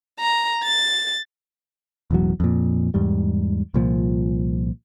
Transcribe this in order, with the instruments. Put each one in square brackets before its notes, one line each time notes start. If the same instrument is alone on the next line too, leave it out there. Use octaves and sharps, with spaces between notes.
[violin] A#5
A6
[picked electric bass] E1 A1 E2 F#3
F2 A#2
E2 G#2 G3
C2 A#2 F3